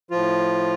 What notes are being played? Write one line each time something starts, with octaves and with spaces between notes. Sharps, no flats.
A2 F3 F4